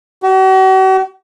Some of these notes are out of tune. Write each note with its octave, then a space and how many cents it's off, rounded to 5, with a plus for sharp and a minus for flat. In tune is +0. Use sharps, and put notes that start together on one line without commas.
F#4 +45